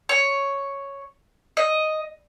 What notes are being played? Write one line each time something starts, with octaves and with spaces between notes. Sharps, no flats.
C#5
D#5